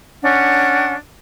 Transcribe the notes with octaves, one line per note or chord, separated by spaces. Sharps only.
C#4 D4 F#5